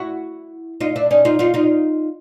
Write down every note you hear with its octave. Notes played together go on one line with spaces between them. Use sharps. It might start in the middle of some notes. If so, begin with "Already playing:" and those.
Already playing: E4 F#4
D#4 F4
D4 E4
C#4 D#4
D#4 F4
D#4 F4
D#4 F4